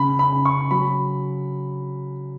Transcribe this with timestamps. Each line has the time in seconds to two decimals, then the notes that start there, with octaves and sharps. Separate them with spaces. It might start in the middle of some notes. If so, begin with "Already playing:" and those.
Already playing: C#3 B5
0.19 B5
0.32 C#3
0.45 C#6
0.71 F#3 B5